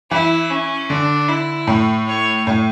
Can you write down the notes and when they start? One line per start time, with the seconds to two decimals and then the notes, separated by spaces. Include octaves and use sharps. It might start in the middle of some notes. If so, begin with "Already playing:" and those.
0.11 E3 E4
0.50 C#4
0.90 D3 D4
1.29 E4
1.67 A2
2.07 C#5
2.47 A2